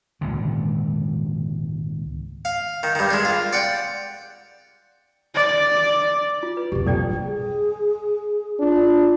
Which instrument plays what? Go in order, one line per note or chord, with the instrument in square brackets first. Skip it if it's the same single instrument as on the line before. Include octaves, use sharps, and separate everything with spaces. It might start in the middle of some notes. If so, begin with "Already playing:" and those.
[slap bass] G#1 C#2 A#2 D3
[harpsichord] F5
D#3
G2 D#3
G#3 D4
F4
D5 F#5 G5
[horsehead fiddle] D5
[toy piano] F4
B4
[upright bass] F1 B1 [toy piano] G4
[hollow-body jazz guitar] G2 A#2 F3 [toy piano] A4 D5 G5
[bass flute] G#4
[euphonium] D4 [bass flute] F4